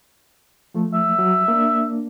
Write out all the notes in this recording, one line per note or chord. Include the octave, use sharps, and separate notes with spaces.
F3 A3
E5
F#3
A#3 D4